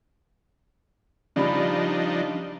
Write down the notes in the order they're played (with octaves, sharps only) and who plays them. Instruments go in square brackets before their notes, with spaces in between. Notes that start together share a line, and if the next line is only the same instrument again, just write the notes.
[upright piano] C#3 G3 B5 [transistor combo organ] F3 D4 D#4